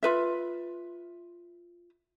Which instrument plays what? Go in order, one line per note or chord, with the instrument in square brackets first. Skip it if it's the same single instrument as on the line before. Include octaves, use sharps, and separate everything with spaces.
[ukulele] F4 B4 E5